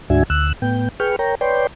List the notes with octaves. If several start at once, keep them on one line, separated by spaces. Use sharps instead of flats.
D2 G#2 D4 F#4 E5 G#5
D2 E6 F#6
A2 B3 G5
G#4 B4 G5 C#6 F6
A#4 C#5 G5 A#5
B4 C#5 D5 G5 C6